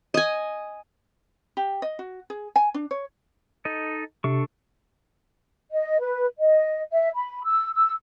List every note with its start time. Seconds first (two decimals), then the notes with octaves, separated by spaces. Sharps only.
0.14 D#5 G#5
1.57 G4
1.82 D#5
1.99 F#4
2.30 G#4
2.56 G#5
2.74 D4
2.91 C#5
3.65 D#4 A4 D#5
4.24 C3 D4 A4 C#6
5.71 D#5
5.99 B4
6.38 D#5
6.91 E5
7.14 B5
7.45 E6
7.74 E6